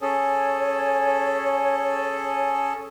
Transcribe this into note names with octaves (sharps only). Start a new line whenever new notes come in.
C#4 G#4 A4 C#5